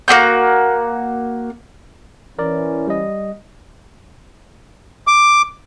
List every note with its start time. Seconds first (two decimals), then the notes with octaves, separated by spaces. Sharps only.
0.08 A#3 B3 F#4 G6
2.39 E3 C#4 A#4 D5
2.87 G3 D#5
5.07 D6